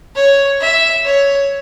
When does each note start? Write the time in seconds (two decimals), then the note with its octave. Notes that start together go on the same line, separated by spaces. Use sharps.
0.16 C#5
0.61 E5
1.05 C#5